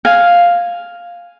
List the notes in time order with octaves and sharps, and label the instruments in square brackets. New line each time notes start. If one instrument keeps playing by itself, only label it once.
[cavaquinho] F5 G#5